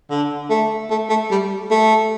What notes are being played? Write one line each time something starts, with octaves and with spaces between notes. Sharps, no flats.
D3
A3
A3
A3
G3
A3